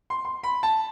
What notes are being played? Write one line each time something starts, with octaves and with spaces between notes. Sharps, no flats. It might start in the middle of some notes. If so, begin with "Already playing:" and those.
C6
C6
B5
A5